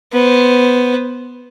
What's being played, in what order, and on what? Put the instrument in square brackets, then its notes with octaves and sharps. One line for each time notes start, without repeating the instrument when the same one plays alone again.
[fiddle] B3 C5